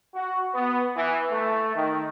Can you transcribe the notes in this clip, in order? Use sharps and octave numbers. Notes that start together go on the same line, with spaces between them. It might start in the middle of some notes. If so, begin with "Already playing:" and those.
F#4
B3
E3
A3
D#3